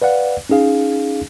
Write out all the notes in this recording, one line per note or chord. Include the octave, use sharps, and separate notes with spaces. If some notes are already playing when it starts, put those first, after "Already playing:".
B4 D5 F5 F#5
C#4 D#4 G#4 F5